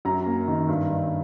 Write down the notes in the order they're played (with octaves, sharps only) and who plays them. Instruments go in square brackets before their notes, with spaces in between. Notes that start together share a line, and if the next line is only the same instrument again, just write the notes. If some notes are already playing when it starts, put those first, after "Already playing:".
[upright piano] F#2 A#5
A#3
D#3
G2
G2